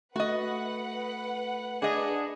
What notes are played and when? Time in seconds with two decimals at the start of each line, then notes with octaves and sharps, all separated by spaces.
0.16 A3 F#4 B4 D#5 F#5
1.82 D4 G#4 D#5